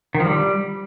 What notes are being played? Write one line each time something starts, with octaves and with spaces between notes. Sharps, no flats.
D#3
F3
G3